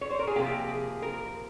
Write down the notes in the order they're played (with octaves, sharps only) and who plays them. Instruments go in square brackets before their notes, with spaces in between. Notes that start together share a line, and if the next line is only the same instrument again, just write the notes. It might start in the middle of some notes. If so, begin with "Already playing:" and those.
[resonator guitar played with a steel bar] C#5
C5
A#4
G#4
C3 F3 A#3 G4
G#4
A#4